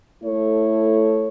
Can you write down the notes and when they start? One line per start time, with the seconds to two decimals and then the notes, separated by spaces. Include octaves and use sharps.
0.21 A3 E4 A4 C#5